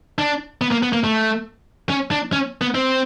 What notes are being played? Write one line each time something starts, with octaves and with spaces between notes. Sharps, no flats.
D4
B3
A#3
B3
A#3
A3
C#4
D4
C#4
B3
C4